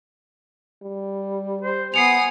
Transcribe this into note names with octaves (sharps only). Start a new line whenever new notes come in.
G3
C5
B3 G#5 D#6 C7 C#7 F7